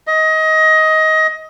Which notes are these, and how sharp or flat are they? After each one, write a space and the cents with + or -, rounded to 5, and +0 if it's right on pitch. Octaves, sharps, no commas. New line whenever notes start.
D#5 +20